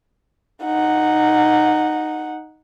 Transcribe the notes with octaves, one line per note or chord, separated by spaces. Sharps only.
D#4 F#5